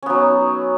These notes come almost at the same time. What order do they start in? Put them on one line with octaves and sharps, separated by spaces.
C#4 B3 F#3 D#4